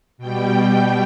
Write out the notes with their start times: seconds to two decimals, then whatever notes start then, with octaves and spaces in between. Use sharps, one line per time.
0.18 B2 G3 G5